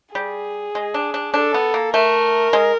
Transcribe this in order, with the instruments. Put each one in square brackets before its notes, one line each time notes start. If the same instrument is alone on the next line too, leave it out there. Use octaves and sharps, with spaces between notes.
[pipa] G3 [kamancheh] G#4
[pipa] G#3
D4
D4
[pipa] D4 [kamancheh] A4
[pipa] B3
A#3
[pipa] A3 [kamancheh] A#4
[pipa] G#3